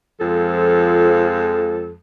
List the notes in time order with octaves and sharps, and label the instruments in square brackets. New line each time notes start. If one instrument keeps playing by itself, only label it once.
[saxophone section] F2 F3 G#3 A4